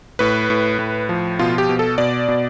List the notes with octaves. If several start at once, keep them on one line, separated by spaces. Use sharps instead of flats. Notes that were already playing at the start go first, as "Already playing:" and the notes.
A2 B4
A2
A2
F3
B2 F4
G4
B2
A4
B2 D5
B2